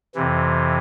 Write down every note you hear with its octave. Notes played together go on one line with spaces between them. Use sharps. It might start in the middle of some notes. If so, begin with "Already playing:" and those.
F2 C3 E3